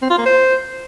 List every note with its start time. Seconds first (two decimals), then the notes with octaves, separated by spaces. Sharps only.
0.02 C4
0.10 F4
0.18 A#3
0.26 C5